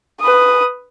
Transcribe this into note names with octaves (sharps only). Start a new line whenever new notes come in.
B4 D#6